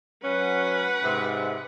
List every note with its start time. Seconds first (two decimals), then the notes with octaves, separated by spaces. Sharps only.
0.24 F#3 C#4 B4 F#5
1.03 G#2 C3